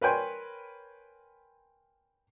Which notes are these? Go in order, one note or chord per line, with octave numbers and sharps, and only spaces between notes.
A#4 B4 C#5 G5 G#5 C6